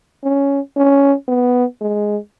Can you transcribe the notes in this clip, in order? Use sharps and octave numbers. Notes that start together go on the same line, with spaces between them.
C#4
C#4
B3
G#3